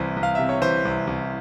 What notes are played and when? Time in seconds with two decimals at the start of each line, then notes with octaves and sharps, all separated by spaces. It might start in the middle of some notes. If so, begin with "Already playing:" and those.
Already playing: C2 E3 C5
0.17 C2
0.23 F5
0.35 C3 E5
0.49 C#5
0.61 E3 C5
0.85 C2
1.07 C2